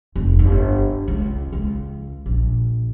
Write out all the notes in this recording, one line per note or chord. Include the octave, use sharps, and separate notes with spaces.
F1
G1
C#2
C#2
A#1